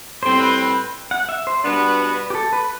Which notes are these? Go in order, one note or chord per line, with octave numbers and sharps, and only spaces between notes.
A2 G3 C4 C5
B4
B4
F#5
E5
C5
B2 G3 B3 D4 F#4 B4
G4
A4
B4